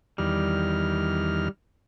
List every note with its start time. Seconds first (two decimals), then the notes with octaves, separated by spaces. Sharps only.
0.18 E2 D#3 G3 F6